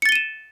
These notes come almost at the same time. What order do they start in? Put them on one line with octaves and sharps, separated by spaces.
C#7 A6 G7 D#7 E7